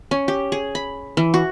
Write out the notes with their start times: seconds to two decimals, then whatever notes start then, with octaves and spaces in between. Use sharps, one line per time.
0.11 C#4
0.28 G4
0.52 G#4
0.75 B5
1.17 E3
1.34 F#4